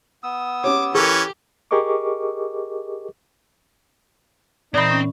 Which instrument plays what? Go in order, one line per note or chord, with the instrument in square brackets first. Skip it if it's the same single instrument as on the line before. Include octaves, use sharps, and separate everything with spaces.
[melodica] B3 D#6 E6
[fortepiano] C#4 G4 C#5 [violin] D6
[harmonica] E3 C#4 C#6 [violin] G4 [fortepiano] A4 A#4
[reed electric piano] G4 G#4 A#4 D#5 C#6 D6
[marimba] A#2 E3 [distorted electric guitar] C4 [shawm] D#4 [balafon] D5 B5
[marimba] C#4